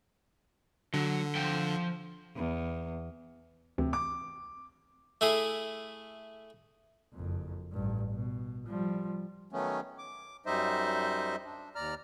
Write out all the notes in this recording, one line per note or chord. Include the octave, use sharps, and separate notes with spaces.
D3 F#3
F3 G5
E2
D2 C3 E3
D6
A3 E4 G#4
F#1 F2
A1 G2
B2
F3 G3
D#3 F#3 A3 B3 C#4
D6
F#2 G3 D#4 C5 D#5 E5
D4
D#2 D5 A#5 F6